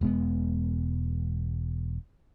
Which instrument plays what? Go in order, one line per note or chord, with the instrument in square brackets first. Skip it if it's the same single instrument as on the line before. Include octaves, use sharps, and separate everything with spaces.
[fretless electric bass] E1 G#3 B3